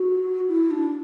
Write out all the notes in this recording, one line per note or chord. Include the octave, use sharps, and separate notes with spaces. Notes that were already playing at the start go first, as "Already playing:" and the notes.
Already playing: F#4
E4
D4